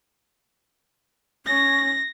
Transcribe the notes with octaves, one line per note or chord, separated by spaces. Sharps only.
C#4 A#6